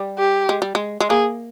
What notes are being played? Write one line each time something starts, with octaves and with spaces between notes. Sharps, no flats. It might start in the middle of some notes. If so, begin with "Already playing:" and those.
Already playing: G3
G4
G#3
G3
G#3
G#3
A#3 G#4